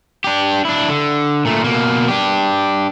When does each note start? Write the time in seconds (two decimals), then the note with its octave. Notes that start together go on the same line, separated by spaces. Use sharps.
0.24 D4 G4
0.65 D4 E4
0.89 D3
1.45 A#2 A3
1.64 B2 A#3
2.08 D4 G4